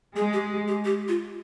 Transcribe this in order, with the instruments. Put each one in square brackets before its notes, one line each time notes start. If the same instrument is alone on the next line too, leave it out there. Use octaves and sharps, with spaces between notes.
[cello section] G#3 [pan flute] G#4
[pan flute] G4
G4
G4
F4